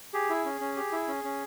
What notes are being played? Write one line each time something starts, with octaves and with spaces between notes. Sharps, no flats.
G4 G#4
E4
C#4
C#4
G4
E4
C#4
C#4